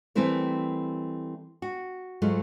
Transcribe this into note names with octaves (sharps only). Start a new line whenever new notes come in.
E3 G3 A3 C4 E4 A#4
F#4
G#2 F#3 G#3 A3 F4